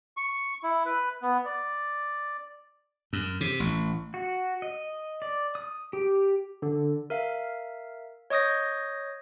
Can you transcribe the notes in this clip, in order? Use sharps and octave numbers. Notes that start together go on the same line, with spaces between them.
C#6
E4
B4
B3
D5
F#2
C3
A1
F#4
D#5
D5
D#6
G4
D3
A#4 E5 F5
C#5 D#5 C#6 D#6 G6 A#6